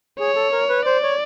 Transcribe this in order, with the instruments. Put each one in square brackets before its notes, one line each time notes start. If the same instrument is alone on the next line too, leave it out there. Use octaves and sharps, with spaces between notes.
[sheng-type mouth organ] G#4 [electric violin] C#5
[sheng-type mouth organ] A4
A#4
B4
[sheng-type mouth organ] C5 [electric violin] D5
[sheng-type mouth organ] C#5